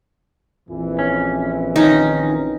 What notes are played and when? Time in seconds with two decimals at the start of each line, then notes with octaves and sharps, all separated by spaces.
0.69 A#1 F2 E3
0.99 C#4
1.76 D#3 C#4 D#4